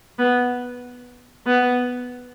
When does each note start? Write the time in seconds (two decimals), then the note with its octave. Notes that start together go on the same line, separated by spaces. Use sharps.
0.19 B3
1.47 B3